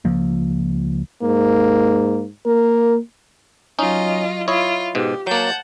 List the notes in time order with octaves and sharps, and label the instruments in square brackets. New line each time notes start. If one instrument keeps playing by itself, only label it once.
[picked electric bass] C#2 F3 A#3
[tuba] G#2 [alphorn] A#3
[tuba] A#3 [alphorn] A#4
[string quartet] F#3 F4 D#5 [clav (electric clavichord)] C#4 D#4
[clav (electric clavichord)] E4 C#5 D#5 [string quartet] F4
[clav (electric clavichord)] G#2 B2 [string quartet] G4
[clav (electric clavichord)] F#3 A#3 [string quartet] F#5 A5 G6